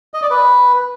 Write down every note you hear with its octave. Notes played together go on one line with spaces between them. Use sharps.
D#5
D5
B4